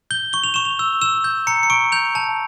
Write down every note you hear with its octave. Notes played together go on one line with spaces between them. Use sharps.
G6 G7
C#6 G7
F7
C#6 E7
F7
E6
E6 E7
G6
A#5 C#7
C#7
C#6 D7
G6 F7
A5